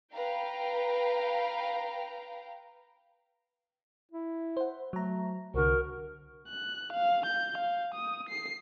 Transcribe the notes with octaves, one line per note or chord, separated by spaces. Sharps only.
B4 F5 G5 A#5
E4
C5 F#5
F#3 A3 A#5
C2 D3 F#4 A#4
F#6
F5
G6
F5
D#6
C7